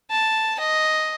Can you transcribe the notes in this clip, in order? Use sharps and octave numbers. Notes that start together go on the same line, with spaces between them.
A5
D#5